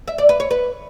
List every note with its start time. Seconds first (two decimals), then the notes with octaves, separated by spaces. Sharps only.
0.08 E5
0.18 D5
0.29 B4
0.40 C#5
0.51 B4